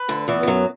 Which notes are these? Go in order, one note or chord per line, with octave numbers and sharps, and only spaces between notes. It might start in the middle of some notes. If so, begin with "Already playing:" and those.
Already playing: B4
D2 D3
E2 E3 B3
E3
F#2 F#3